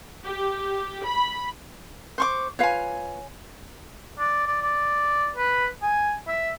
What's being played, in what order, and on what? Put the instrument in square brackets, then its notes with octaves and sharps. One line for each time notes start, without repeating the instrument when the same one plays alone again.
[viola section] G4
B5
[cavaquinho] C5 C#6 D6
[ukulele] F4 B4 F5 [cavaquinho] C#5 G#5
[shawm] D5
D5
D5
B4
G#5
E5